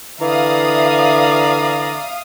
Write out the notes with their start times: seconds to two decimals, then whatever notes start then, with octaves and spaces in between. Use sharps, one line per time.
0.21 D3 E3 D5 E5 F5 A#5 D#6